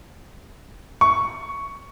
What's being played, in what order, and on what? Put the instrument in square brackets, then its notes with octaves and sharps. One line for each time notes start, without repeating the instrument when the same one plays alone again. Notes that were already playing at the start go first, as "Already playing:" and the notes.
[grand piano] C#6